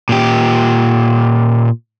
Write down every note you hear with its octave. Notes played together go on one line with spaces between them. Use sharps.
A#2 G4